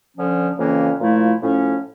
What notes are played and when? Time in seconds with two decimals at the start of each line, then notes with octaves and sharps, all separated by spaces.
0.15 D3 F3 C#4
0.58 F2 C#3 E3 A#3 C#4
1.00 A#2 F3 A3 E4
1.42 A2 F3 C#4